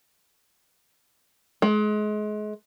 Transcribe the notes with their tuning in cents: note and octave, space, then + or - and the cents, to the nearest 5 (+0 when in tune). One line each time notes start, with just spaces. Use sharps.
G#3 +30